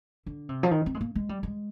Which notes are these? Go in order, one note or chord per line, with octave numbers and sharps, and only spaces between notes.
D3
C3
F3
D#3
C4
G#3
A#3
G#3
G3
G#3